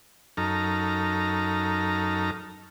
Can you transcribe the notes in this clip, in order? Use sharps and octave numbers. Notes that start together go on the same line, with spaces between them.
F#2 D#4 A4 A#5 F6